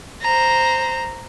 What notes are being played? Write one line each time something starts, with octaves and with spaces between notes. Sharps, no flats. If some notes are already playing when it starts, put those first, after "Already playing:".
C5 A#5